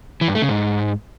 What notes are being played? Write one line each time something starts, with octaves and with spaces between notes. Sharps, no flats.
E3
G2
A3
C#3
G#2